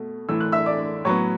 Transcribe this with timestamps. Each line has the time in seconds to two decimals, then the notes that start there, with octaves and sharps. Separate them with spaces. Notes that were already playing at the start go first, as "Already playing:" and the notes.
Already playing: B2 A3
0.29 A2 E3 A3 E6
0.40 F#6
0.52 E5 E6
0.66 D5 D6
1.04 A2 F#3 B3 C#5 C#6